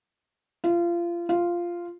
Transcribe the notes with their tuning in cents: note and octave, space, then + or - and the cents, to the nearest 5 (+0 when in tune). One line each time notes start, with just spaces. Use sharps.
F4 -25
F4 -5